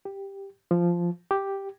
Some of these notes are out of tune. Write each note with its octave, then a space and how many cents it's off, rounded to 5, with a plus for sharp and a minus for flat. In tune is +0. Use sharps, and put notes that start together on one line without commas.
G4 +5
F3 -10
G4 +0